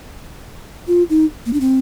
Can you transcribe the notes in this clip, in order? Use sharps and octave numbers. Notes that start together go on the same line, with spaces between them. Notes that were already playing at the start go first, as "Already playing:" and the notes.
F4
D#4
A#3
D4
C4